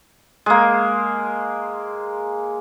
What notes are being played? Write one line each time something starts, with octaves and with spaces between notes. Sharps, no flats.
G#3 A#3